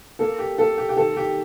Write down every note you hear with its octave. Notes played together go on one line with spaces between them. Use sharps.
A#3 A4
G4
A#3 A4
G4
G4
D#3 A4
G4